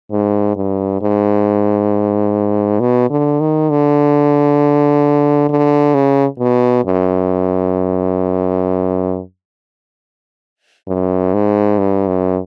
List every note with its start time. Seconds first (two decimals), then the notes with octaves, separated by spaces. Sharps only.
0.11 G#2
0.56 G2
1.01 G#2
2.80 B2
3.10 D3
3.40 D#3
3.70 D3
5.49 D3
5.94 C#3
6.40 B2
6.85 F#2
10.88 F#2
11.33 G#2
11.79 G2
12.08 F#2